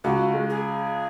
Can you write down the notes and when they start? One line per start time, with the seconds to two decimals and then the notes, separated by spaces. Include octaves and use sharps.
0.04 C#2 F#4
0.34 G#3
0.49 G#4